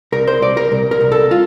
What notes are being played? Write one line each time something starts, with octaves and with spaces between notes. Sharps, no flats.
C2 A#4
C5
C2 D5
A#4
C2
A#4
C2
A4
F4